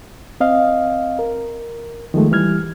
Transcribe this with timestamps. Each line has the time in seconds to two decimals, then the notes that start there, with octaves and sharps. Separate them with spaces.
0.40 C4 D#5 F5
1.19 A#4
2.14 D#3 F3 G#3 A3
2.31 E3 G3 F6 G#6